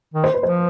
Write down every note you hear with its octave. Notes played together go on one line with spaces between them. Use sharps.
D#3
C5
B4
F3 C5